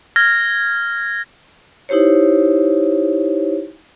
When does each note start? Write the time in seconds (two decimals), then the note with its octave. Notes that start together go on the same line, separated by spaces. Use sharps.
0.16 F6 G#6 A#6
1.89 D#4 E4 G4 C5 C#5